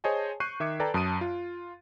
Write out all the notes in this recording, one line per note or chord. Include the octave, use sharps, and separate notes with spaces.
G#4 C5 C#5 D#5 G#5 A5
C#6 F#6 G6 C7 D#7
D#3 E5 D6 G#6 C#7
A4 B4 D5 G5 A5 A#5
F#2 A5 D#6 D7 D#7
F4